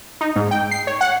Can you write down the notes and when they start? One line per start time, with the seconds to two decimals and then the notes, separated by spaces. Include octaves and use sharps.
0.21 D#4
0.36 G#2
0.51 G5
0.71 C7
0.87 C#5
1.01 F#5